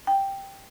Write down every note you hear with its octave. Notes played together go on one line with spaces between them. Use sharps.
G5